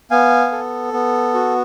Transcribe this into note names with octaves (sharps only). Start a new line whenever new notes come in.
B3 F5 G#5
A4
B3
F#4